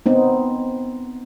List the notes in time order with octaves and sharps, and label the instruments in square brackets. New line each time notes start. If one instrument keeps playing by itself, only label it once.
[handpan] B3 C4 D#4